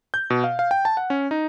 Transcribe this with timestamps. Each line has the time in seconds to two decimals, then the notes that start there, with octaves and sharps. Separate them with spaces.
0.14 G6
0.30 B2
0.44 F5
0.59 F5
0.71 G5
0.85 A5
0.97 F#5
1.10 C#4
1.31 D#4